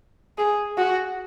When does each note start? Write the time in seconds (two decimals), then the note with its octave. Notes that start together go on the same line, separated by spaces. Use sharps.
0.38 G#4
0.78 F#4